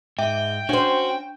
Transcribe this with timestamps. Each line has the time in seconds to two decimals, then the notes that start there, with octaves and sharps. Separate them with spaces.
0.19 G#2 E5 G5
0.69 C#4 D4 F#4 C5